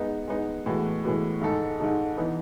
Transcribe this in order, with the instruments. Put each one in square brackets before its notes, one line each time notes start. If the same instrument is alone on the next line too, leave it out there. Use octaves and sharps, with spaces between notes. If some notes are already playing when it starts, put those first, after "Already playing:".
Already playing: [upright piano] G#3 B3 D#4
G#3 B3 D#4
A2 E3 G#3 B3 F#4
A2 E3 G#3 B3 F#4
G#2 D#3 G#3 D#4 A4
G#2 D#3 G#3 D#4 A4
E3 B3 D#4